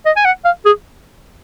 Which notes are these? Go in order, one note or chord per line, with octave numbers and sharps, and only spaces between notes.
D#5
G#5
F#5
F5
G#4